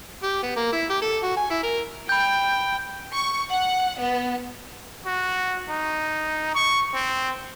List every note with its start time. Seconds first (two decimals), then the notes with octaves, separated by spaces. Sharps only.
0.23 G4
0.43 B3
0.56 A#3
0.73 E4
0.90 G4
1.02 A4
1.23 F#4
1.37 G#5
1.51 E4
1.63 A#4
2.09 G5 B5 G6
3.13 C#6
3.50 F#5
3.98 B3
5.06 F#4
5.69 D#4
6.55 C#6
6.94 C4